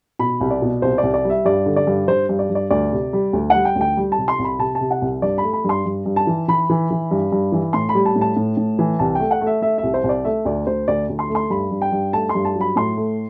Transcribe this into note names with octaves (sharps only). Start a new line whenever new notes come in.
B2 B5
C2
D5
B2
C2 C5
D5
C2
D5
G3 E5
G2 D5
D3
D5
G2
G2 C5
G2
D5
G2
D5
D2 D5
C3
G3
D2
F#5
G3
G5
D2
G5
G3
A5
C3
C6
C2
B5
C3 A5
A5
C3
F#5
C2
G2 D5
B5
A3
B5
G2 C6
G2
G2
A5
E3
E3 B5
E3
E3
G2
G2
E3
A2 C6
B5
G3
A5
A2
A5
A2
A2
E3
C2 A5
A3 G5
F#5
A3
E5
A3 E5
E5
C2
C5
C2
D5
A3 E5
D2 D5
D2 C5
D2 D5
D2
C6
A3
C6
G2 B5
G2
G5
G2
A3 A5
C6
G2
A5
F#3
B5
A2 C6
A3